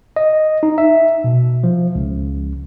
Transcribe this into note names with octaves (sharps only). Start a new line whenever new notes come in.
D#5
D#4
E5
B2
F3
C#2